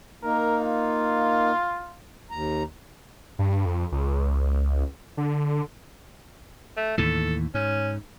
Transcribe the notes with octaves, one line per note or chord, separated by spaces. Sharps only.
A#3 D#4 A#4
F4
D#2 A#5
G2
F2
C#2
D3
A3
D#2 A2 E3 A4
G#2 C#4